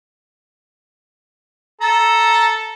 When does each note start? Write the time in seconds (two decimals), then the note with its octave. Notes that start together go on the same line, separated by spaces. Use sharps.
1.81 A4 A5 A#5